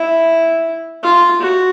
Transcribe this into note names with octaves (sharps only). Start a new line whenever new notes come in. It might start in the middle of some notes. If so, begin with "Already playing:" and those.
Already playing: E4
F4
F#4